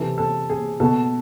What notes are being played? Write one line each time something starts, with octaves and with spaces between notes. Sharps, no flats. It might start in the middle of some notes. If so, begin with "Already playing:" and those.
Already playing: C3 E3 A4
A4
G#4
B2 A4